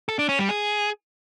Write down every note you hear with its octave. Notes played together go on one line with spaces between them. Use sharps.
A4
D4
C#4
G3
G#4